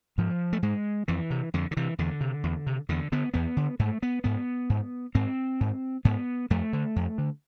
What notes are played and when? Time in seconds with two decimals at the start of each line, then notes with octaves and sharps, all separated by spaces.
0.18 G#2 F3
0.53 A3
0.63 G#2 G#3
1.08 F2 E3
1.30 C3
1.54 F2 D3
1.71 D3
1.77 C3 E3
1.99 E2 D3
2.21 C3
2.44 E2
2.67 C3
2.89 E2 D3
3.12 D3 B3
3.34 E2 B3
3.57 D3
3.79 G#2 A3
4.03 B3
4.24 G#2 B3
4.70 G#2
5.15 G#2 C4
5.61 G#2
6.05 G#2 B3
6.50 F2 A3
6.73 D3
6.96 F2
7.18 D3